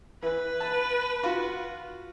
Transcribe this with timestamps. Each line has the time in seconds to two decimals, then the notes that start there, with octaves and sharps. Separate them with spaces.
0.22 E3 B4
0.60 A5
1.23 F4 F#4